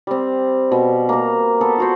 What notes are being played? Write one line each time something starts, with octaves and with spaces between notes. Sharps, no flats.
G3 C4
B2
A#3 A#4
B3 A4
F4 F#4 C5